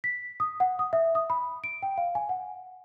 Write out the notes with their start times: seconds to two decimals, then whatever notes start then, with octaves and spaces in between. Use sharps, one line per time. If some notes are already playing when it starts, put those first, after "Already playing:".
0.04 B6
0.40 D#6
0.60 F#5
0.79 D#6
0.93 E5
1.15 D#6
1.30 B5
1.64 D7
1.82 G5
1.98 F5
2.15 G#5
2.29 F#5